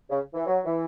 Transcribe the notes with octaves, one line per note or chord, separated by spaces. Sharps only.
C#3
E3
F#3
E3